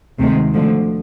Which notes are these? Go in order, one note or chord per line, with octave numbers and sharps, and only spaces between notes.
D2 C3 D#3 G#3
D2 D3 F3